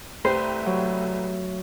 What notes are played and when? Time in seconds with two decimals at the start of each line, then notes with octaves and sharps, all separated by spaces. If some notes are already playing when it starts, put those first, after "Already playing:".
0.25 C2 A3 G4 B4 C5
0.66 F#3